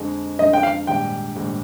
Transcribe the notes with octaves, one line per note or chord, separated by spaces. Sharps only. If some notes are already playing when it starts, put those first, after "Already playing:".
Already playing: F2 D3 F3 G#3 D#4
F2 D3 F3 G#3 D#4 D#5
G5
F5
A#1 G#2 D#3 G3 G5
A#1 G#2 D#3 G3